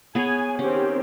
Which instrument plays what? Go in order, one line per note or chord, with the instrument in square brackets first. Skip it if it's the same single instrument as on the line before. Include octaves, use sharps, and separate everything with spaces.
[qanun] B3 G#4 C#5 [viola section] G#5
[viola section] D#3 C4 G4 [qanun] C#4